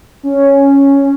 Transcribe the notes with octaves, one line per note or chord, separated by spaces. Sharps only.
C#4